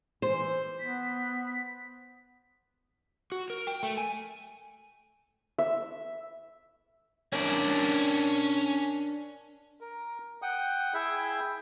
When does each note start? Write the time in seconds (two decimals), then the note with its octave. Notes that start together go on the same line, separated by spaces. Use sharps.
0.22 E3 C5
0.80 B3 B6
3.32 F#4
3.50 A#4
3.67 G5
3.83 A3
3.98 G#5
5.58 E5
7.33 C#4 D4 A#4 C#5 D5
9.81 A#4
10.42 F#5 G5 D#6
10.94 E4 G#4 E5 G5